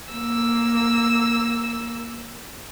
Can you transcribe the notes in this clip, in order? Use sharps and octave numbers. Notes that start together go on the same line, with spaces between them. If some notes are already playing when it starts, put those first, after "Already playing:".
A#3 E6